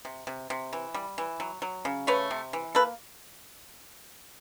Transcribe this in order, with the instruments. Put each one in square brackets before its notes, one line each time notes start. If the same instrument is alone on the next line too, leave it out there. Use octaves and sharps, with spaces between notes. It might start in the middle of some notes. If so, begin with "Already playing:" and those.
[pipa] C3
C3
C3
E3
G3
E3
F#3
F#3
C#3
A3 B4 C#5
C3
E3
A#3 A4 B4